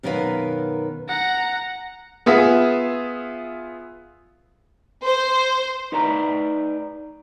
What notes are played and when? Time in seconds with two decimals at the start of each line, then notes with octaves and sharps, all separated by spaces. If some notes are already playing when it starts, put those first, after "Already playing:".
0.03 F#2 B2 D#3 A#4 B4 F5
1.08 F#5 A#5
2.26 B3 F4 G#4 E5 B6
5.05 C5
5.92 D#4 B4 D5 A#5